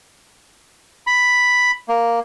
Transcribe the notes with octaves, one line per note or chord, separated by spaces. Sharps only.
B5
A#3